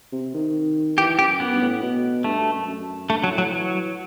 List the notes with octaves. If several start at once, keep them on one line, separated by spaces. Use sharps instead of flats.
C3
D#3
E3 G4
F#2 G4
F#2 B3
G2
A2
B2
G2 A3
G2
F#2
F#2
G2 A3
F#3
A2
F#3
E3 F#3